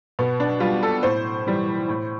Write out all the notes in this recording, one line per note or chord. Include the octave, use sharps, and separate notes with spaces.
B2 B3
D4
G3 F4
A4
A2 C5
E3 G3
A2